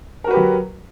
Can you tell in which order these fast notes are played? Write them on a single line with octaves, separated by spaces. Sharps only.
A#4 F#4 B4 G4 F#3